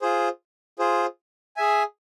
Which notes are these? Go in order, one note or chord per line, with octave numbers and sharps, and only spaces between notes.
F4 G#4 C5
F4 G#4 C5
G#4 E5 G#5